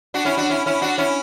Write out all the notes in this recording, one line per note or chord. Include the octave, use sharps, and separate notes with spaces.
D4 F#4
C#4 E4
D4 F#4
C#4 E4
C#4 E4
D4 F#4
C#4 E4